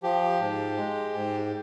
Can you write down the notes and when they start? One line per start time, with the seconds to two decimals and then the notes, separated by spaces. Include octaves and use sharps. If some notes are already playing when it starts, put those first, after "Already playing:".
0.03 F3 G4
0.40 G#2
0.77 G#3
1.14 G#2